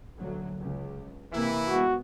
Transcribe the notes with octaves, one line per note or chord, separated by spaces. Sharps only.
D2 A#2 F#3
C#2
C3 E3 A#3 E4
G#3 B3 F#4